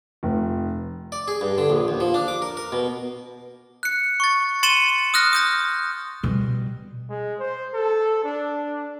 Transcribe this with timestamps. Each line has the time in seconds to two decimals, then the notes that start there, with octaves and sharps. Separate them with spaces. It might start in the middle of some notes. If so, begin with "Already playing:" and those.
0.23 F1
1.12 D5
1.28 G#4
1.41 G2
1.58 D3
1.70 A#1
1.88 D#2
2.00 F3
2.14 D4
2.28 D6
2.42 A#4
2.57 A#4
2.72 B2
3.83 F#6 C#7
4.20 C#6 A6
4.63 C6 A6 C#7 D#7 E7 G7
5.14 D#6 F6 F#6 A#6
5.33 D#6 G6 A#6
6.23 B2 G3
7.10 G#3
7.39 C5
7.73 A4
8.24 D4